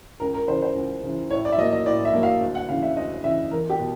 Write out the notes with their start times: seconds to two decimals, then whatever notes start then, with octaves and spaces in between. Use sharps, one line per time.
0.20 C#2 A#4
0.34 A#4
0.48 C#3 E3 C5
0.62 C5
0.75 C#2
1.03 C#3 E3
1.30 A2 C#5
1.45 D5
1.52 E5
1.58 F#3 A#3 D#5
1.72 D#5
1.86 A2 D5
2.05 E5
2.13 F#3 A#3
2.23 F5
2.40 D2
2.55 F#5
2.69 C#3 F5
2.71 E3
2.82 E5
2.96 D2 D#5
3.24 C#3 E3 E5
3.51 E2 A#4
3.70 G4
3.79 B2